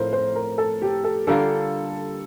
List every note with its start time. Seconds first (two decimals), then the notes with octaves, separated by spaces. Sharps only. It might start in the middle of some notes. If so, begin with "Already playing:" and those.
Already playing: A2 F3 C4 A#4 C5
0.13 C5
0.35 A#4
0.58 A4
0.82 G4
1.04 A4
1.27 D3 G3 A#3 F4 A4